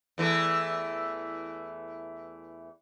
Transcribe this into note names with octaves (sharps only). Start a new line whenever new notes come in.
E2 E3 A3